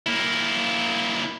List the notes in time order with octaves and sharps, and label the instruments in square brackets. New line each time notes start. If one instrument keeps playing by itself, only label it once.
[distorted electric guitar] A#3 E4